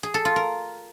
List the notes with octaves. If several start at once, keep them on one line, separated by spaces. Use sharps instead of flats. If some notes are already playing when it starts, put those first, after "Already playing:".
G#4
A4
F4
A#4